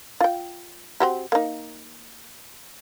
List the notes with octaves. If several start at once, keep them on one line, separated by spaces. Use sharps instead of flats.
F4 G5
C4 F#4 G4
A#3 D#4